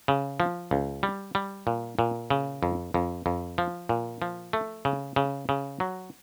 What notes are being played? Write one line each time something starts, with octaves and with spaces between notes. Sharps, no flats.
C#3
F3
C#2
G3
G3
A#2
A#2
C#3
F2
F2
F2
F3
A#2
F3
A3
C#3
C#3
C#3
F#3